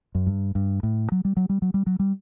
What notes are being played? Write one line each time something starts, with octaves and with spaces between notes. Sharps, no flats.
F#2
G2
G2
A2
F#3
G3
F#3
G3
F#3
G3
F#3
G3